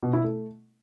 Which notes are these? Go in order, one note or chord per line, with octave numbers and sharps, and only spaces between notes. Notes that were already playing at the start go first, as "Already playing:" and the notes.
B2
E4
A3